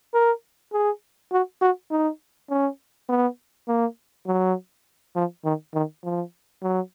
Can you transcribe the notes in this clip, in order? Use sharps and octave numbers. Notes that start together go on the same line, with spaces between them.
A#4
G#4
F#4
F#4
D#4
C#4
B3
A#3
F#3
F3
D#3
D#3
F3
F#3